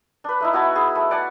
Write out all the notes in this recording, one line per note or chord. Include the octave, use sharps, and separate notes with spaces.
D4 B4
A3 D#4 E4
B3 F#4 G#5 A5
G#4
A3
D5 F#5 G#5 A5